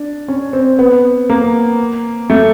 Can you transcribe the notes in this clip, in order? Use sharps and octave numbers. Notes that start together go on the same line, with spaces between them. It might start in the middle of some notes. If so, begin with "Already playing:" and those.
Already playing: D4
C#4
C4
B3
A#3
A3